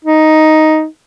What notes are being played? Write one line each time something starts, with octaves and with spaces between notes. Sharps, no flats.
D#4